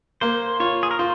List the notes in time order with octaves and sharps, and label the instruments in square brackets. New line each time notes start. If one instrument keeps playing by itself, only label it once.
[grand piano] A#3 [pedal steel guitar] C5
[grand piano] F4 [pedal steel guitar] C#5
[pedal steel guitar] G#4
A#4
[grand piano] F4 [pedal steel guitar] C5